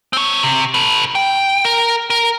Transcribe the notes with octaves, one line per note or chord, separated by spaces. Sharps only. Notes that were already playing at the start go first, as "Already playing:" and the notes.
C4 C#5
C3
A4 B4
G5
A#4
A#4